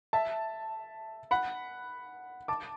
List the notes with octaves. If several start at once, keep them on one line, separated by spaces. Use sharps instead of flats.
E5 A5
F#5 B5
A5 D6